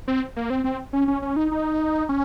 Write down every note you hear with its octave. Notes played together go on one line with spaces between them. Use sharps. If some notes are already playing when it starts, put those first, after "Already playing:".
C4
A#3
C4
C4
C#4
C#4
C#4
D#4
D#4
C#4